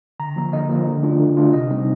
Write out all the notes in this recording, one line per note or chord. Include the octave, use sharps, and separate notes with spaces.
D3 A#5
F3 A#3
D3 D#5
F3 A#3
D3
A3 D4 F4
D3
A3 D4 F4
C3 D#5
G3 C4 D#4